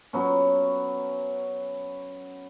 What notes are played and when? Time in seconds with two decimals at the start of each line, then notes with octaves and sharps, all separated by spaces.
0.13 F#3 B3 C#4